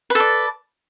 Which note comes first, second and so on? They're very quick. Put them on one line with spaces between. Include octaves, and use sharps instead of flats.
B4 A4 D5